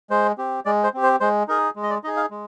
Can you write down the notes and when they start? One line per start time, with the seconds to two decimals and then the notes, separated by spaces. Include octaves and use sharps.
0.10 G#3 C5
0.38 C4 G4
0.65 G#3 D5
0.84 C5
0.94 C4 G4
1.03 C5
1.20 G#3 C5
1.48 D#4 G#4 A#4
1.76 G#3
1.83 D#5
1.90 D5
2.04 D#4 D#5
2.07 G#4
2.17 F5
2.31 G#3